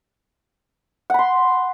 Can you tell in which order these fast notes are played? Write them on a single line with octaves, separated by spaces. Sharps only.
F#5 B5 C6